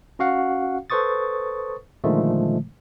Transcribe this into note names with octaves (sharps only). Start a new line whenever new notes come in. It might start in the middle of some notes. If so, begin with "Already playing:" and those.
C#4 F#4 F5 F#5
A4 B4 C5 C#6 D#6 A6
A#2 D3 D#3 F3 G#3 A3